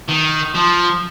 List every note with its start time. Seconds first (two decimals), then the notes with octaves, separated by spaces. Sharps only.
0.08 D#3
0.55 F3